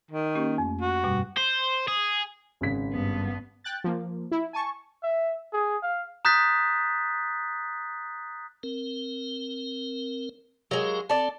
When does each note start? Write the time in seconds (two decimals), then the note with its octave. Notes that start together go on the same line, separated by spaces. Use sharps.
0.11 D#3
0.35 A#3 C#4 G4
0.58 F2 A3
0.81 F#4
1.04 G2 B2 G3
1.38 C5
1.88 G#4
2.61 G#1 C#3 B6
2.92 G2 B3
3.64 G5 F#6 A6
3.84 F3 A#3
4.31 E4
4.53 G#5 A5 C#6
5.03 E5
5.53 G#4
5.83 F5
6.25 A#5 D#6 F#6 G6 A6 B6
8.63 C4 A#4
10.71 F#3 G#3 G4 A#4 F5
11.10 C4 A4 D5